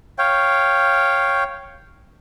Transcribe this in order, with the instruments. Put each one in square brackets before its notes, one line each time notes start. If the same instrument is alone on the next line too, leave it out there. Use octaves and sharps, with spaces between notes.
[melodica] C#5 F5 G5